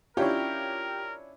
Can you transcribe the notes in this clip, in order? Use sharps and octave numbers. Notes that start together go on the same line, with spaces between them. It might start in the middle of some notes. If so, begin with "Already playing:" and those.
C#4 D4 E4 F4 G4 A#4 C#5